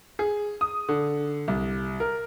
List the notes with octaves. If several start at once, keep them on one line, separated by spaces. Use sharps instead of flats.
G#4
D#6
D3
C2
A#4